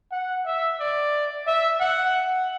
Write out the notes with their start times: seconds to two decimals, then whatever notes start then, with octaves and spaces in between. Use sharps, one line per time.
0.12 F#5
0.46 E5
0.80 D5
1.47 E5
1.80 F#5